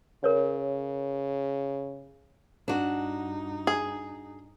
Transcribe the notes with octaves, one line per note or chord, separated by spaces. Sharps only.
C#3 A#4 C#5
G2 D4 D#4 F#4
G#4